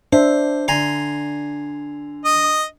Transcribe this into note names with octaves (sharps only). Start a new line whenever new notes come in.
D4 C5 E5
D3 G#5 A#5 C6
D#5 D#6